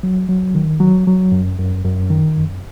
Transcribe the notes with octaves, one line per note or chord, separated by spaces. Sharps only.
F#3
F#3
D#3
F#3
F#3
F#2
F#2
F#2
D#3
F#2